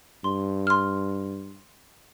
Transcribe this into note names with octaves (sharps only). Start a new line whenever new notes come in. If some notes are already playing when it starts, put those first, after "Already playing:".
G2 C6
C6 F6